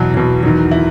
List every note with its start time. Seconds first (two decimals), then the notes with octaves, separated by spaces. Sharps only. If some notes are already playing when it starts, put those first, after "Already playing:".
Already playing: E2 B2 F#3
0.14 E2 B2 F#3
0.43 E2 D#3 F#3
0.71 D#3 E4